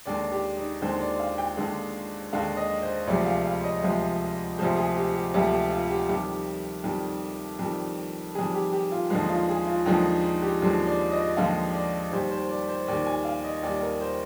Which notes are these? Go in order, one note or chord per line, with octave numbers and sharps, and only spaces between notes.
D#2 D3 G#3 D5
G4
D#4
D#2 D3 G#3 C5
D5
F5
G5
D#2 D3 G#3
D#2 D3 G#3 F5
D#5
C5
D2 C3 F3 G#3 D5
F5
F5
D#5
D2 C3 F3 G#3
D2 C3 F3 G#3 C5
G#4
G4
G4
D2 C3 F3 G#3 G4
G4
F4
G4
F2 D#3 G3 G4
F2 D#3 G3
F2 D#3 G3
F2 D#3 G3 G#4
G4
G4
F4
D#2 D3 F3 G#3 D#4
F4
G#4
F4
D#2 D3 F3 G#3 D#4
D#4
G4
D#2 D3 F3 G#3 G4
D5
D#5
D#2 D3 F3 G#3 F5
D5
D#2 D#3 G3 C5
C5
D5
C5
D#2 D#3 G3 D5
G#5
F5
D#5
D#2 D#3 G3 D5
A#4
C5